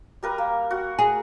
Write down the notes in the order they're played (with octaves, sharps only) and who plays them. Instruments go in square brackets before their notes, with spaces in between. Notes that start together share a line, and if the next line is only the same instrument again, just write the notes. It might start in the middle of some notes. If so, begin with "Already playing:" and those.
[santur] G3 A#4 B4
A#3
F#4
[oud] G#4